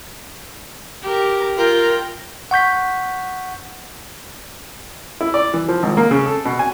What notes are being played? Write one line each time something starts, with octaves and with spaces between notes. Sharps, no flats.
G4 A#4
F4 A#4 G5
F#5 C#6 G6 B6
E4
D5
E3
F3
G#1
A#3
C#3
A4
B2
G#5